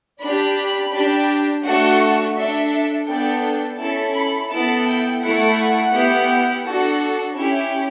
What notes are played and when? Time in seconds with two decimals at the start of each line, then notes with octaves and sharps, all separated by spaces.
0.20 D4 G4 B5
0.92 D4 G4
1.63 A3 D4 F#4 A4 F#5
2.35 D4 A4 E5
3.07 B3 D4 A4 G5
3.78 C#4 E4 A4 A5
4.14 B5
4.49 B3 E4 A4 A5
4.85 G5
5.21 A3 E4 A4 F#5
5.92 B3 E4 G4
6.64 D4 F#4 A4
7.35 C#4 E4 G4 E5